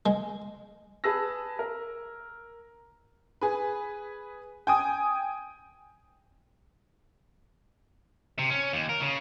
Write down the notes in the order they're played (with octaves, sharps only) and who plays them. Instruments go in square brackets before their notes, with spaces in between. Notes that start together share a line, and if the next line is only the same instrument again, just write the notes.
[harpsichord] G#3
[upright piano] G#4 B4 A5 E6 A#6
A#4
[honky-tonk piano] G#4 B4
G5 G#5 D#6
[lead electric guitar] C3
C#4
D#2
A#4
C#3